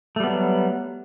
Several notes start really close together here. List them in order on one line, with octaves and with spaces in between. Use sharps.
A3 G3 B3 F#3